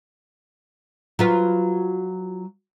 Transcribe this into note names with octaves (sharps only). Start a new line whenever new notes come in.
F#3 F4 B4